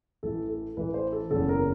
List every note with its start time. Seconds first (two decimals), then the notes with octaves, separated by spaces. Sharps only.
0.23 A1 A2 E3 A4
0.49 A4
0.77 A1 A2 E3 B4
0.94 C5
1.12 A4
1.30 F#1 E2 C#3 A4
1.49 A#4